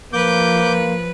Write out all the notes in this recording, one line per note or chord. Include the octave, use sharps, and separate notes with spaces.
F3 A#3 B4 D6 G6